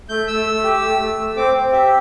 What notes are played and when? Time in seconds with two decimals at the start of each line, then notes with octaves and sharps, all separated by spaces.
0.09 A3 G6
0.28 A3 E6
0.46 A3
0.63 G4
0.81 A3
0.99 A3
1.19 A3
1.36 C4 D6
1.55 C4
1.72 G4 E5